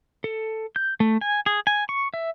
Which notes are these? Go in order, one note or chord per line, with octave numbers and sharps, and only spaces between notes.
A4
G6
A3
G#5
G#4
G#5
C#6
E5